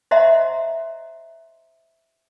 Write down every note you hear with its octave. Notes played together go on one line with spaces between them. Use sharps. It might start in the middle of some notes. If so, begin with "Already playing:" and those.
C5 D#5 E5 F#5 A#5 C6